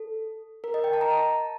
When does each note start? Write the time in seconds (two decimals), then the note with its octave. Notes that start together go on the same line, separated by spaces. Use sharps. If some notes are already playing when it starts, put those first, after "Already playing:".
Already playing: A4
0.64 A#4
0.74 D#5
0.84 G5
0.93 A5
1.01 A#5
1.10 A5